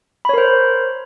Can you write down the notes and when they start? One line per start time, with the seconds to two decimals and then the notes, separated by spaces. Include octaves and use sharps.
0.25 B5
0.29 C#5
0.34 A#4
0.38 C5